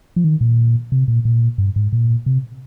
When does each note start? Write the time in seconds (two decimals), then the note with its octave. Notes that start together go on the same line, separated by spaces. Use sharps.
0.16 F3
0.24 D#3
0.41 A#2
0.92 C3
1.08 A#2
1.25 A#2
1.58 G2
1.76 G#2
1.93 A#2
2.26 C3